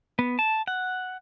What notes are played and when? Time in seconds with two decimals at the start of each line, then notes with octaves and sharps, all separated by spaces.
0.19 B3
0.39 A5
0.68 F#5